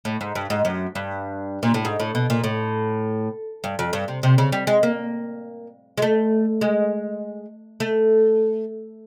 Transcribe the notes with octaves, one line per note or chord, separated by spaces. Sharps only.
A2
G#2
G2
G#2
F#2
G2
A#2
A2
G#2
A2
B2
A#2
A2
G2
F2
G2
C3
C3
C#3
G3
G#3
A#3
G#3
A3
G#3
A3